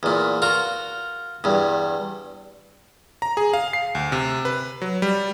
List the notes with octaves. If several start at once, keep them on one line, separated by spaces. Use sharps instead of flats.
E2 A#2
F4 F#4 A#4
E2 G2
A#5
G#4
F5
C7
D2
C3
B4
F#3
G3